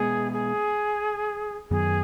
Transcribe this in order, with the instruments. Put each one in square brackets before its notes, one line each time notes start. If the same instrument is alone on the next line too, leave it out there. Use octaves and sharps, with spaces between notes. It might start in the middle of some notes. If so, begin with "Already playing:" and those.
Already playing: [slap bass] B2 G#3 B3 [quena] G#4
[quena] G#4
[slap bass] F#2 D#3 F#3 B3 [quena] G#4